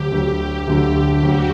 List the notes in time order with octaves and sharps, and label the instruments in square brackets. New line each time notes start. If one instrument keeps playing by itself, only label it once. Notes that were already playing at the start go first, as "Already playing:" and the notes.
Already playing: [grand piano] D2 D3 F#3 [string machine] G4
[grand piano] D2 D3 F#3 [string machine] G4
[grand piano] D2 D3 F#3 [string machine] G4
[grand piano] D2 D3 F#3 [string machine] F#4